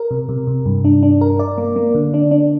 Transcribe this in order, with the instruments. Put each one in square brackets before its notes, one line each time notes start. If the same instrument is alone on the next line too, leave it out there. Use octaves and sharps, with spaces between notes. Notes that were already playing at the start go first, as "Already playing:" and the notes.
Already playing: [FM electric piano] A#4
C3
C3
C3
G2
D4
D4
A#4
D5
A#3
A#3
D3
D4
D4